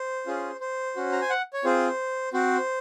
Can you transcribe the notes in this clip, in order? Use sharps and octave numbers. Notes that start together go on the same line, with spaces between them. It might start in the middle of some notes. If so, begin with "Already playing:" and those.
Already playing: C5
C#4 F4 G#4
C5
C#4 F#4
A#5
G#5
F#5
C#5
C4 F4 G#4 C5
C4 F#4 C5